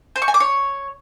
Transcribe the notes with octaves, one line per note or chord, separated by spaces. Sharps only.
C5
C#6
G#5
D6
C#5